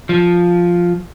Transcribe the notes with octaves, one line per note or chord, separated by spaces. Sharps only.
F3